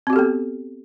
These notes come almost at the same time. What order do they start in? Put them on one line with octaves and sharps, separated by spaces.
C4 F#4 G4 A4 B3